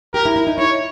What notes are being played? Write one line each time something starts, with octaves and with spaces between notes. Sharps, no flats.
G4 A#4
E4
E4
D#4
E4 C#5